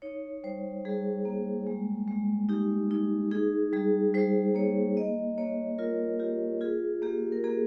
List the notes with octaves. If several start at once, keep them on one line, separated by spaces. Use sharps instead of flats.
D#4 C#5
G3 C5
G3 G#4
A#3
G#3
G#3
D#4 G4
D#4
D#4 G#4
G3 G#4
G3 C5
A#3 C#5
A#3 D#5
A#3 C#5
F4 A#4
F4 G4
F4 G#4
A#3 G4
A#4
A#3 G#4